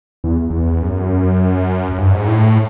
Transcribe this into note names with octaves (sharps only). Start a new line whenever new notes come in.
E2
E2
F#2
F#2
G2
G#2
A2